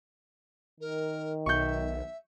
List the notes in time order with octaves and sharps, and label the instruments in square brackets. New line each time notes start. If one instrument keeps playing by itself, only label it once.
[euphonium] D#3 [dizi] A#4
[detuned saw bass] B1 [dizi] E5 [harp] C#6 G6